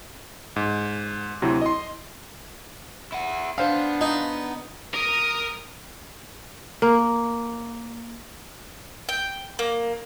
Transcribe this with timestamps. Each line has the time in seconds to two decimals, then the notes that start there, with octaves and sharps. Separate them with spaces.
0.56 G#2
1.42 D2 C3 F#3 E4
1.61 D#5 C6
3.12 E4 F#5
3.58 B3 D4 C5 F5
4.01 D#4
4.94 A#4 A#5 D#6
6.82 A#3
9.09 G5
9.59 A#3